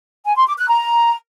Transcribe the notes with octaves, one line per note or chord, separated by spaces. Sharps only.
G#5
C6
D6
F#6
A#5